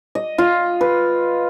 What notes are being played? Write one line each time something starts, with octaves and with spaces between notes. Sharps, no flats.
D#5
F4
B4